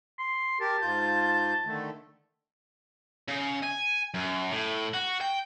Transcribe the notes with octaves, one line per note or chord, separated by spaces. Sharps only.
C6
G4 A#4 A5
G#2 F4 G6
D3 D#3 A3
C#3
G#5
F#2
A2
F#4
G5